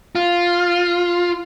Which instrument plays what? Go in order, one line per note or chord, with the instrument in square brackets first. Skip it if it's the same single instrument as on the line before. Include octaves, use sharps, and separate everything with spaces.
[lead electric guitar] F4